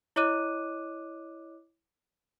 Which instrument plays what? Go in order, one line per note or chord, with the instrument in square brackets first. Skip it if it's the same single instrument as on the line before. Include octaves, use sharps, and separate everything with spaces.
[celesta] E4 C#5 D#5 D6 F#6 D#7